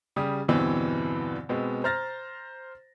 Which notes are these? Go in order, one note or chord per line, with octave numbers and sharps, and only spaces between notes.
C#3 G3 G4 D#6
E2 G2 B2 D3 E3 C4
B2 G#3 B3 C4
C5 A#5 F6 A6 A#6